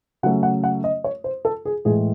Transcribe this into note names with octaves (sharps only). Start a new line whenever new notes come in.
C#3 F#3 A3 C#4 F#5
F#5
F#5
D#5
C#5
C5
A4
G#4
A2 E3 G#3 G#4